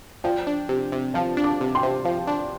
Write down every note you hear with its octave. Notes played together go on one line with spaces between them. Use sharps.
F3 D5 G5
D4
C3
C3
F3 F5 A5
D4
A5 D6
C3
G5 C6
C3
F3
D4